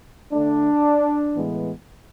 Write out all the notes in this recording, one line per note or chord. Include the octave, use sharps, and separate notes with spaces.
D3 A3 D4
A2 E3 G#3 B3